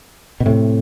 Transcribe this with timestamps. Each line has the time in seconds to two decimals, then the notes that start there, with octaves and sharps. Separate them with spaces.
0.40 B2
0.46 A2 C3